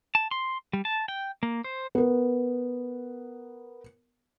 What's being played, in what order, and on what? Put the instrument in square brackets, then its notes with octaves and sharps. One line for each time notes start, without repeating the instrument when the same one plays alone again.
[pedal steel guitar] A5
C6
G3
A5
G5
A#3
C5
[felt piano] B3 A#4